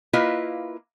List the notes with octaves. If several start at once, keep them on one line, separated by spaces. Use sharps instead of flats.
A#3 E4 F4 B4 D#5